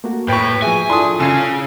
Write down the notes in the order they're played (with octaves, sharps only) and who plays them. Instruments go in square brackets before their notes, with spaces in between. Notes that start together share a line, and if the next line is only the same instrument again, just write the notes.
[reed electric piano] A3 A#3 F#4
[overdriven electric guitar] A2 [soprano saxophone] B4 [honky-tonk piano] G5 C#6
[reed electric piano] F3 E5 [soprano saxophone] G#4 [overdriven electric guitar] G#5
[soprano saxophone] D4 [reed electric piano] E4 F4 A4 [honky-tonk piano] C6 D#6
[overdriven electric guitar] C#3 C#4 [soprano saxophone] G#5 [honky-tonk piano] E6 C7